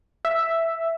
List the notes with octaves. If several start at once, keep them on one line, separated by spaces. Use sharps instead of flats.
E5